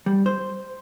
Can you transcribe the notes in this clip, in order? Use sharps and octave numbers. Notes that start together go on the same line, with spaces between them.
G3
C5